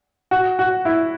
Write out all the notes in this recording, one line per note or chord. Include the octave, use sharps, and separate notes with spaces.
F#4
F#4
E4